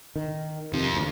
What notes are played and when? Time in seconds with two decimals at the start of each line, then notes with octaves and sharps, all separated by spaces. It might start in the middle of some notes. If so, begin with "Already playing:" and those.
0.16 D#3
0.73 F2 C3 D#3
0.94 D2